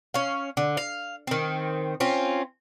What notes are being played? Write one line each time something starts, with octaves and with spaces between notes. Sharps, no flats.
C#4 F5
D3
F5
D#3 C4
C4 C#4 F4